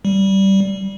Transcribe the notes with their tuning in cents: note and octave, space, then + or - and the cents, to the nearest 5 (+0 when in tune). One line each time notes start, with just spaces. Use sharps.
G3 -15